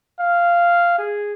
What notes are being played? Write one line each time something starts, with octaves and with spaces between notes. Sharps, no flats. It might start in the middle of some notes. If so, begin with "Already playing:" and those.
F5
G#4